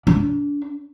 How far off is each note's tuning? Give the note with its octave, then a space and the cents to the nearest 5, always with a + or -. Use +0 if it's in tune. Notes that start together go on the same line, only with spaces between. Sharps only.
D4 -30